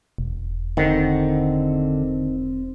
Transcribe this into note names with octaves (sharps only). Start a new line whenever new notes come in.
E1
D3 D#3 C4 F#5